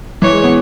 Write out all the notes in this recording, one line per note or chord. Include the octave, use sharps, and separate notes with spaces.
E3 C#5
G#3
B3